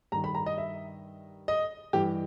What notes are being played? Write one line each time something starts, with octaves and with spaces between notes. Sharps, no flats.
G2 D#3 A#5
B5
A#5
D#5
E5
D#5
G2 E3 G4